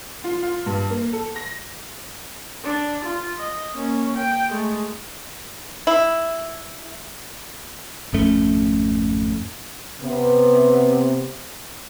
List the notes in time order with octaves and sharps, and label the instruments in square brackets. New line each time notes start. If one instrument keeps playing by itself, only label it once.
[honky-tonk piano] F4
F4
G2
A#3
A4
A#6
[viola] D4
F4
D#5
A#3 C#4
G5
G#3 A3
[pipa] E4
[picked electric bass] G#1 F2 A3 C#4
[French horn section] C3 B3